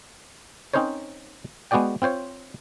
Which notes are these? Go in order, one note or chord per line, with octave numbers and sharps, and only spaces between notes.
C4 C#4 D#4 A#4 C5 C#5
G#3 B3 F#4 G#4 D5 G5
C4 F4 C5 C#5